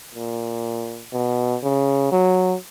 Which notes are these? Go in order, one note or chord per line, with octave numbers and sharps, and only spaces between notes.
A#2
B2
C#3
F#3